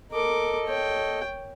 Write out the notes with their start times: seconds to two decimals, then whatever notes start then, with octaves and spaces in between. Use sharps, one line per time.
0.11 A4 A#4 D#5 D6
0.67 C#5 G5